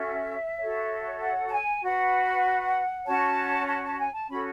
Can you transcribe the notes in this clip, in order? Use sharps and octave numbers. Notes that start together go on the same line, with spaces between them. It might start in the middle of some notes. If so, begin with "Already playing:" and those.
Already playing: C#4 F#4 A4 C#5 E5
F#4 A4 C#5
F#5
A5
G#5
F#4 B4 F#5
C#4 F#4 C#5 A5
A5
A5
G#5
A5
C#4 F#4 A4 B5